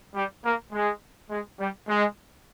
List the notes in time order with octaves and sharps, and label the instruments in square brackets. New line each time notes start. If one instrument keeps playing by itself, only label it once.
[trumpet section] G3
A#3
G#3
G#3
G3
G#3